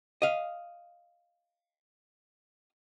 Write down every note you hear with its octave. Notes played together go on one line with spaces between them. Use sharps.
D#5 F5